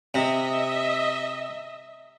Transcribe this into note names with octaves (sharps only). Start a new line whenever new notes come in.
C3 D#5 E5